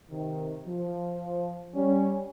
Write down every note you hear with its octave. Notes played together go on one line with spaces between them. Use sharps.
C3 D#3
F3
G3 C#4